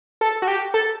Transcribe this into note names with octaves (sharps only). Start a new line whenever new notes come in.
A4
F#4
G4
A4